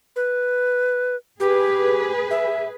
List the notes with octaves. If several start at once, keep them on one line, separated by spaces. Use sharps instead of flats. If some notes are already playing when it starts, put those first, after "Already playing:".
B4
G4 G#4 B4
E5